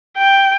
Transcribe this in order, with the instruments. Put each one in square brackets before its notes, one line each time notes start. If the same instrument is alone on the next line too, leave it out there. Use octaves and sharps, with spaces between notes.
[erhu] G5